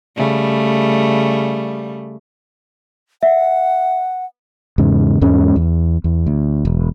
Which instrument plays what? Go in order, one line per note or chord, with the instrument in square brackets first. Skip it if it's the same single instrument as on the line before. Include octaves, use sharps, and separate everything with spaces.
[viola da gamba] C#3 G3 A3
[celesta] E5 [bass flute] F#5
[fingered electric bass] E2 G#2 C#3
E2 G#2 G#3 C#4
E2
E2
D2
E1